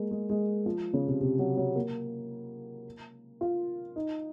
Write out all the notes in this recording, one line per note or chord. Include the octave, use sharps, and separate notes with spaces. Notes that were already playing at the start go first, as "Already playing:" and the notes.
Already playing: G#3 A#3
G#3
G#3
F3
C#3
C3
C3
F#3
F#3
A#3
F4
D#4